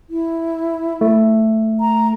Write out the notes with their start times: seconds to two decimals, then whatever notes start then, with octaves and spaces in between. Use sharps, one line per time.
0.10 E4
1.01 A3
1.80 A#5